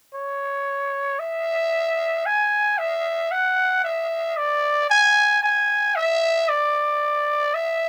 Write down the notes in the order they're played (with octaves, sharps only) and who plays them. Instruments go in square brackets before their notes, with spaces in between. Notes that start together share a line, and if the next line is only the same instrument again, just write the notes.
[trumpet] C#5
E5
G#5
E5
F#5
E5
D5
G#5
G#5
E5
D5
E5